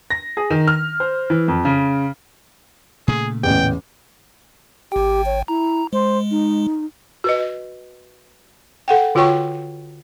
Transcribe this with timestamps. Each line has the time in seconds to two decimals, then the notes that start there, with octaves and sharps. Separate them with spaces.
0.10 A#6
0.37 G#4
0.50 D#3
0.68 F6
1.00 C5
1.30 E3
1.48 F2
1.65 C#3
3.08 A#2 C#3 A3 G#4
3.43 A1 E2 G5
4.92 G#1 G4 G5
5.26 C#5
5.48 E4 A#5
5.93 G#3 C5
6.31 D#4
7.24 F#4 B4 D#5
8.88 A4 F#5 G5
9.15 D3 F4 F#4 C#5 G5 C#6